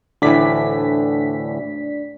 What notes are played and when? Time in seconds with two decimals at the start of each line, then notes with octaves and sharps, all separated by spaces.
0.22 D2 A2 E3 D4 D5 B6